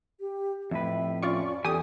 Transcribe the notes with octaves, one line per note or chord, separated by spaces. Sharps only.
G4
F2 A2 B4 E5
C#4 F4 D5 C#6
E2 G4 A4 G#5 D#6